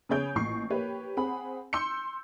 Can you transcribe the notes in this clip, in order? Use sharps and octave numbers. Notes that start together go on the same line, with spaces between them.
C#3 B3 G#4 C#5 G6 D7
A1 A#2 C#6 C7
A#3 G4 B4 C#5
C4 G#4 F#5 B5
C6 E6 G6 C#7